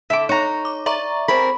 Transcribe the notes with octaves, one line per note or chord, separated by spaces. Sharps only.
D3 E5 D6
D#4 C#5 A#5 C#6
D6
D5 E5 A#5 C#6
C4 G#4 A#4 B5